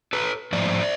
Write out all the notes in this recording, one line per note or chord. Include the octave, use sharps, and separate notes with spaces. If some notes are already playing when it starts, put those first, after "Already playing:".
A4 B4
G#2 F3 A3 C5 D5